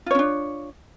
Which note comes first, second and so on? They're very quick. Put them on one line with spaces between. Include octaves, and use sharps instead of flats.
F4 C#5 C#4 D4